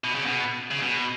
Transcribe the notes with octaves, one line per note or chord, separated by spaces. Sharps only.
B2
C#3
B2
C#3
B2